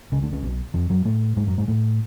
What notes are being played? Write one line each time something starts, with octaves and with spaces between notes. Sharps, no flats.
C#2 C#3
D2 D3
C#2 C#3
B1 B2
F2 F3
F#2 F#3
A2 A3
G#2 G#3
F#2 F#3
G#2 G#3
A2 A3